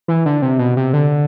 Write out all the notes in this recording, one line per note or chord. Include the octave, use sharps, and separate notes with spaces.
E3
D3
C3
B2
C3
D3